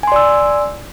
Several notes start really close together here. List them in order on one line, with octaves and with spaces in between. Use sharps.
G#5 C6 D5 E6